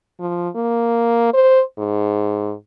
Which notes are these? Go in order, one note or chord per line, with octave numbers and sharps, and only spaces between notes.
F3
A#3
C5
G#2